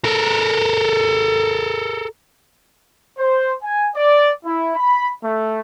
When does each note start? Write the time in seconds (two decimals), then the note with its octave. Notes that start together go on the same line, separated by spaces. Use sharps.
0.04 A4 A#4
3.18 C5
3.62 G#5
3.96 D5
4.45 E4
4.76 B5
5.23 A3